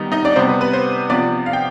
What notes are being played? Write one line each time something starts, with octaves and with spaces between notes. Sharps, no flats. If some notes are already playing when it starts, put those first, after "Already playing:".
Already playing: D#3 G3 B3 D#4
D#4 D#5
D4 D5
C3 G3 B3 C5
B4
B4
C5
C3 F3 B3 D4 D5
F5
G5